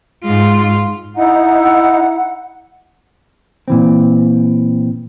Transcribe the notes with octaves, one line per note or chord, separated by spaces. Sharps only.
G#2 F4
D#4 E4 F#5
A#2 E3 C4